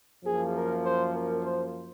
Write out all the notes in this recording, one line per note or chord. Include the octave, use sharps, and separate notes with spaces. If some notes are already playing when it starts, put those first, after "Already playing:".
F#2 F3 A#3 G#4
A#4
C5
A#4
C5